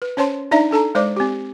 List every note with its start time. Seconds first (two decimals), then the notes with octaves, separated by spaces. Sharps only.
0.02 B4
0.17 C#4 C5 C#5 A5 C6
0.51 D4 D#4 D5 E5 A#5
0.71 D4 A4 A5 A#5
0.95 G#3 C5 D5 D6
1.16 C4 G4